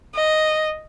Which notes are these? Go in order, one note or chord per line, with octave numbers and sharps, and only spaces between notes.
D#5